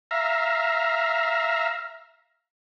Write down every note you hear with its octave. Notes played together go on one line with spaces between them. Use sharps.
E5 F5 A#5